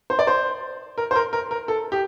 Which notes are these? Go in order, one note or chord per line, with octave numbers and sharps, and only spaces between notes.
C5
D5
C5
A#4
C5
A#4
A#4
A#4
A4
G4